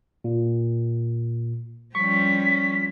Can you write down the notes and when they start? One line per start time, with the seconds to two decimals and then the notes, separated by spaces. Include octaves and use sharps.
0.24 A#2
1.95 F3 G3 C#4 C#6 B6